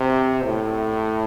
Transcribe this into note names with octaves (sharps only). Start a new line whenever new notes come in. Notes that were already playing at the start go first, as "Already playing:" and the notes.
Already playing: C3
A2